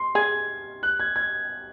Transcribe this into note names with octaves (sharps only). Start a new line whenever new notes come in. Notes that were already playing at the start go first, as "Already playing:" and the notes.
Already playing: C6
G#4 G#6
F#6
G#6
G#6